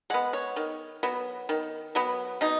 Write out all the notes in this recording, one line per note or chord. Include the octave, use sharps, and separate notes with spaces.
G#3 B3 F#5
C#5
D#3
F#3 B3
D#3
F#3 B3
B2 D#4